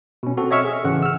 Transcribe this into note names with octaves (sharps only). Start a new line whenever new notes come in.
B2 C#4
C4 F#4 A4
C#5 D#5 E5 C#6 E6 F6
G#4
A1 C#3 F#5
E6 F6